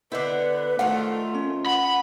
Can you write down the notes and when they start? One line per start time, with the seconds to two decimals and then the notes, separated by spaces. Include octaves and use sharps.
0.12 D3 B3 E4 B4 C5 D#5
0.79 D#3 F3 A3 F4 F#4 F#5
1.34 C#4
1.66 F#5 B5